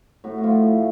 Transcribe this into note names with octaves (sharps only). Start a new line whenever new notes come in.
A2 F#4
F#4
F3 A3 F4
A2